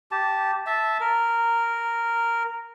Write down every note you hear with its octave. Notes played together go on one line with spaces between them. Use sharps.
G4 A5
E5 A5
A#4